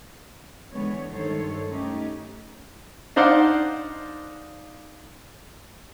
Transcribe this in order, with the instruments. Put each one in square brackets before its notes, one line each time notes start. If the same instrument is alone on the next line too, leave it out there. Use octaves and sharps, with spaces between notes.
[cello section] D3 E3 G#3 B3 C#5
G2 D#3 G#3 A4 C5 C#5
A3 C#4 D#4 G4
[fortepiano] D4 D#4 C5 D5 F5 F#5